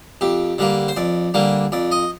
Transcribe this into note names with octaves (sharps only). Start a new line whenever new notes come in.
F2 G4
D3 G3 A#3
C5
F2 D5
D3 G3 A#3
F2 D5
D#5